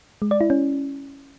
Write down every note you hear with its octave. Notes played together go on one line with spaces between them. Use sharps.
G#3
D5
E4
C#4